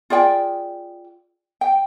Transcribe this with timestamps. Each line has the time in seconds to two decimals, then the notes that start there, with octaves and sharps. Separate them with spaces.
0.10 F4 G#4 D5 G5
1.61 G5